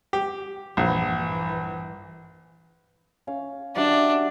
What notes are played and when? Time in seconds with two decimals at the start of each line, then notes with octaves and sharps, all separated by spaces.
0.13 G4
0.77 A#1 G2 E3
3.27 C#4 F5
3.76 G3 D4 F#4 E5